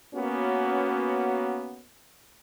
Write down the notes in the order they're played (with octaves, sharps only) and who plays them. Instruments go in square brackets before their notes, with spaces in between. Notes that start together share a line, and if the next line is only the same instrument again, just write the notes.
[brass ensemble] A#3 B3 C#4 F#4